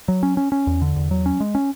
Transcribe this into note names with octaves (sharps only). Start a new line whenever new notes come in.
F#3
C#4
C#4
C#4
E2
D3
E2
F#3
C#4
G#3
C#4